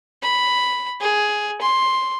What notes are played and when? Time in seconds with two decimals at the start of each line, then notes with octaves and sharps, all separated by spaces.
0.22 B5
1.01 G#4
1.61 C6